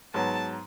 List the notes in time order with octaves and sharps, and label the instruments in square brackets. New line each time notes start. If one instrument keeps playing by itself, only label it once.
[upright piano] G#2 F#3 B3 [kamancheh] A5